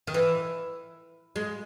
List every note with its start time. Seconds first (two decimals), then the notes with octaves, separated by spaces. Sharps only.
0.07 D#3
0.14 E3
1.36 G#3